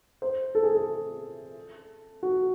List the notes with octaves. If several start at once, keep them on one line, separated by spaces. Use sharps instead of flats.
C5
A4
G#4
A4
F#4